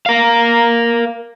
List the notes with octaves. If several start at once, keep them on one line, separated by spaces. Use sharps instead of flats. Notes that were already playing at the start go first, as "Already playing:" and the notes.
A#4 F5